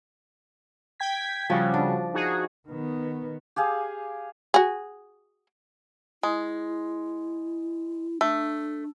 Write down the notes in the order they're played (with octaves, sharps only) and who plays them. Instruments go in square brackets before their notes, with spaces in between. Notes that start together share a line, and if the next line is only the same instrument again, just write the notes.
[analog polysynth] G5 G#6 B6
[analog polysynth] C#3 G3 F#4 [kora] F3 C#4
[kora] D4
[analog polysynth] D#4 F#4 G#4
[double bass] D#3 B3
[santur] G4 G#4 F5 G#5
[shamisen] F#4 G#4
[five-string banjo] G#3 [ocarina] E4
[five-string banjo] A3 [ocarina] D4